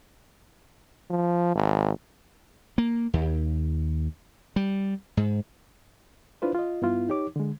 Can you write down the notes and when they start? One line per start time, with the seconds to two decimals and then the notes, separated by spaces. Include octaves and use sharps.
1.10 F3
1.55 G#1
2.78 A#3
3.14 D#2
4.56 G3
5.17 G#2
6.42 D4 E4 F4 B4 C5
6.55 F4 D#5
6.82 G2 B3 E4 F4
7.09 D#4 G4 C#5 D6
7.36 D3 G#3